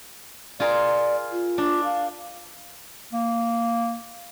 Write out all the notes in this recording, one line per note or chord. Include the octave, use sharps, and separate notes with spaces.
F4 G#4 A#4 D5
F4
D4
F5
A#3